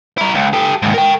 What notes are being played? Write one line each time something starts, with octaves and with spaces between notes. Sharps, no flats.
E4 A#4
C#2
G4 A4
D#2 G#2
A#4 G5